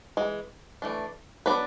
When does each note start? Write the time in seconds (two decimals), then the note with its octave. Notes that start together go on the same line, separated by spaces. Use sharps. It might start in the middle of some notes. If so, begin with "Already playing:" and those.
0.17 E3 G#3
0.82 E3 A3 D4
1.46 F#3 B3 D4 B4 D5